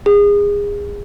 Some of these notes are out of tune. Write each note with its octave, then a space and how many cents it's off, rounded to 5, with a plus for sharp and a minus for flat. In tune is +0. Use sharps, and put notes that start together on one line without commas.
G#4 -30